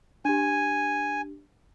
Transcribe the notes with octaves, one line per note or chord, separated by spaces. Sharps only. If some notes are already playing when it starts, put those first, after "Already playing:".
D4 G4 G#5